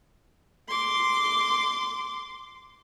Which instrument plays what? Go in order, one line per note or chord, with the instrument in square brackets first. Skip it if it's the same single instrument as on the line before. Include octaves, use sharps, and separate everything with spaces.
[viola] C6 D6